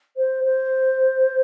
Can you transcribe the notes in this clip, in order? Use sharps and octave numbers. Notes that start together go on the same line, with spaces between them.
C5
C5